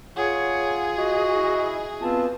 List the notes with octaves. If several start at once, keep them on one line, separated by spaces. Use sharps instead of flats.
F4 G#4 C#5 F#5
F#4 D#5
E4
B3 C4 F4 A5